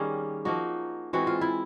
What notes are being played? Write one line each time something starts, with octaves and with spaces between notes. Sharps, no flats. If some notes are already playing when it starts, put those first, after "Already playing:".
Already playing: D#3 G3 A#3 C#4 G#4
F3 A#3 D#4 F#4
E3 G#3 C4 F#4
F4
E4